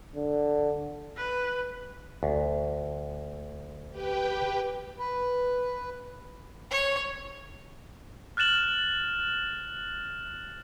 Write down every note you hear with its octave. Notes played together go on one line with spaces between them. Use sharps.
D3
B4
D2
G4 B4 G5
B4
C#5
F6 F#6 A6 E7 F#7